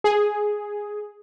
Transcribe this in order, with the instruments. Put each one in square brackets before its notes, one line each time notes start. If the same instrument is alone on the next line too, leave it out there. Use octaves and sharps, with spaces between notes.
[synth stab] G#4